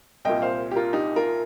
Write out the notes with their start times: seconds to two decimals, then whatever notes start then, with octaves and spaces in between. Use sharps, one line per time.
0.25 C2 A#2 D#5 G5
0.42 C5 F5
0.71 G4
0.76 F4 A#4
0.93 D#4 G4
1.16 F4 A#4